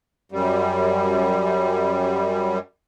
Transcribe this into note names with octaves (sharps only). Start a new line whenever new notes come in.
F#2 G3